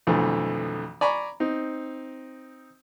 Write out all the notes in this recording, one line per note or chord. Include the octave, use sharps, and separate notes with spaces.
B1 F2 D3 E3 A3
D5 G#5 A#5 B5 C#6
C4 D#4